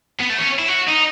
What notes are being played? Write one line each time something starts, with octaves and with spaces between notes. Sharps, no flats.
B3
A3
C#4
E4
F#4
D#4